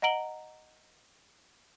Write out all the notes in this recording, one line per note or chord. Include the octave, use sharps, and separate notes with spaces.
D#5 F#5 A#5 D7 F#7 G7